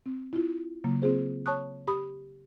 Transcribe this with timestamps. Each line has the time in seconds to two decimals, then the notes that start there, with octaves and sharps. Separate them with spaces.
0.06 C4
0.33 E4 F4
0.84 C#3 F#3 A#3
1.02 C4 F4 G#4 C5
1.46 C#5 A5 C#6 D#6 F#6
1.87 G4 B5 D#6